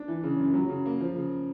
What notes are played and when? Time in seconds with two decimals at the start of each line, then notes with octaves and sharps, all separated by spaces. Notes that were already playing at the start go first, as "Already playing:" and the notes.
Already playing: D4
0.08 E3
0.23 C#3
0.40 F#2
0.54 F#3
0.69 C#3
0.86 A#3
1.01 F3
1.15 C#3